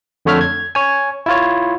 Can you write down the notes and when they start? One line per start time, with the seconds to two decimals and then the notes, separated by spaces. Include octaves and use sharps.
0.25 F2 D3 A3 C#5 E5 F6
0.41 G#6
0.75 C#5 G#5
1.26 E4 F4 C#5